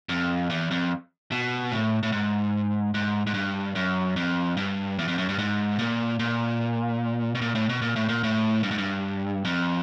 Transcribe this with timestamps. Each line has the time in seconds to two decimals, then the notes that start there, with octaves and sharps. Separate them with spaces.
0.09 F2
0.50 E2
0.71 F2
1.32 B2
1.72 A2
2.03 A2
2.12 G#2
2.94 G#2
3.27 G#2
3.34 G2
3.75 F#2
4.16 F2
4.57 G2
4.99 E2
5.08 F2
5.18 F#2
5.29 G2
5.39 G#2
5.79 A#2
6.20 A#2
7.35 B2
7.42 A#2
7.55 A2
7.69 B2
7.82 A#2
7.96 A2
8.09 A#2
8.23 A2
8.63 G2
8.71 G#2
8.78 G2
9.45 F2